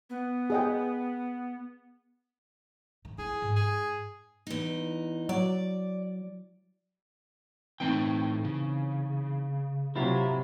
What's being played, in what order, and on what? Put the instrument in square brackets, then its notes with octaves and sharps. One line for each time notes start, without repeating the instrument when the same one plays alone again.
[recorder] B3
[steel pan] G#4 D#5 G5
[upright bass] D#3
[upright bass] E4 [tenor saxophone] G#4
[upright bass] G#2
[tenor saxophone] G#4
[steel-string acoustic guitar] E2 D#4
[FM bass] F#3 [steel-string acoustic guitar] D5
[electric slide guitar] A2 G5 [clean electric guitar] E3 C4 D#4
[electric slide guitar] C#3
[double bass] C3 F#3 [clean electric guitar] E4 F4 G4